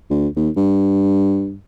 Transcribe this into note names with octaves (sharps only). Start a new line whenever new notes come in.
D2
D#2
G2